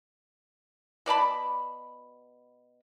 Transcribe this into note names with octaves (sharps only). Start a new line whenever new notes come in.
B2 D5 A5 B5